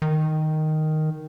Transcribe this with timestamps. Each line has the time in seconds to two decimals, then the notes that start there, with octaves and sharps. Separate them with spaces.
0.02 D#3